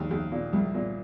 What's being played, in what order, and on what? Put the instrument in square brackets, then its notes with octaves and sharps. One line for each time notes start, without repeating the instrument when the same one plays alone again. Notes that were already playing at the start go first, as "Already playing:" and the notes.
Already playing: [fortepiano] D#2 G3
D#2
A#2
C2
A#2